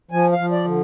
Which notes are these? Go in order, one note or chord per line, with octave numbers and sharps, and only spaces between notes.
F3 G#5
F5
F3
D5
D3